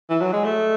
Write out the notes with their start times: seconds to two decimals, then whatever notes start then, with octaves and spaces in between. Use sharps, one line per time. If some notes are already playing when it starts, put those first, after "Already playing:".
0.10 E3
0.21 F#3
0.33 G#3
0.44 A3